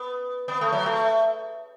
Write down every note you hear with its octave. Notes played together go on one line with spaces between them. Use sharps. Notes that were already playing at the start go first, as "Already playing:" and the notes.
Already playing: B3
B3
A3
F#3
A3